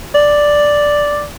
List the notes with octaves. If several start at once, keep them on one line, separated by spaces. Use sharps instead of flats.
D5